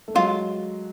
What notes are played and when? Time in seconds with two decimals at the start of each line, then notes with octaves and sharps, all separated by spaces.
0.08 A3
0.15 F#3 G#3 F4